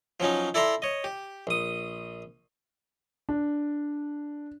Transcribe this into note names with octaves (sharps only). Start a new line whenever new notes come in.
F3 F#3 C#4 D#4
E4 A4 D5 E5 A#5 C6
C#5 D#5
G4
A#1 D#6
D4